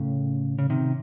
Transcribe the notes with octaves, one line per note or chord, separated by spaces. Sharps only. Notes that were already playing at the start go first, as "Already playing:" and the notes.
Already playing: A2 C#3
C#3
C3 D#3